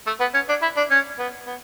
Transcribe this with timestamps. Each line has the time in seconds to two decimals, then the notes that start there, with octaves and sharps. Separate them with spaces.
0.07 A3
0.20 B3
0.34 C#4
0.49 D4
0.62 E4
0.77 D4
0.91 C#4
1.19 B3
1.47 B3